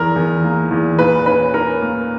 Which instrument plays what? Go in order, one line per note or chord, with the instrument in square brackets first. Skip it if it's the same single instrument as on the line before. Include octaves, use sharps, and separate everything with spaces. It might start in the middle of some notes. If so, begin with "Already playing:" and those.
Already playing: [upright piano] E2 A#4
E2
A#3
E2
A#2 B4
C#4 B4
C#4 A#4
A#3